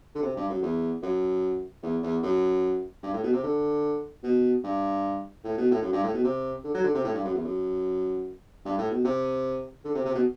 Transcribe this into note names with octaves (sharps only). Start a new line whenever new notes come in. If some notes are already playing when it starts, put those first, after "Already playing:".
D3
C3
G2
F#2
E2
F#2
E2
E2
F#2
G2
A2
B2
C3
D3
B2
G2
A2
B2
A2
F#2
G2
A2
B2
C3
D3
F#3
D3
C3
A2
G2
F#2
E2
F#2
G2
A2
B2
C3
D3
C3
C3
B2